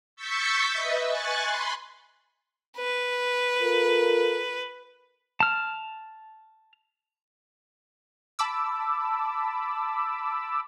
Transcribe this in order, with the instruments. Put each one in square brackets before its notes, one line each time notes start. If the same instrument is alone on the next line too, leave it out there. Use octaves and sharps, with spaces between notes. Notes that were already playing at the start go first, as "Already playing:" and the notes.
[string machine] C#6 E6 G6 A6 B6 C#7
B4 D#5 E5
G#5 C#6 F#6 A6
B5 C6
[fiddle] B4
[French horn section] F4 A4 A#4
[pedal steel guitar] A5 F6
[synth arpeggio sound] A5 B5 D6 E6